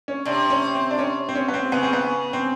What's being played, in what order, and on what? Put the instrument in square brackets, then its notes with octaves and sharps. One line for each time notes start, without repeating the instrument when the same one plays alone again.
[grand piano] C#4
[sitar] C3 [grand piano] D4
[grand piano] C#4
C4
D4
C#4
C4
C#4
B3
C4
[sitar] C#3 [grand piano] B3
[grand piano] C4
B3
C4